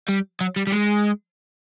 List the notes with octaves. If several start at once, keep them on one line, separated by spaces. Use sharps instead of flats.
G3
F#3
G3
G3
G#3